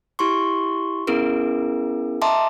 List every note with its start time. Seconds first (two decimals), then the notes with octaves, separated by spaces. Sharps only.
0.19 E4 G4 C6 C#6
1.07 B3 C#4 E4 G#4 A#4
2.22 D#5 E5 A5 A#5 C6 D6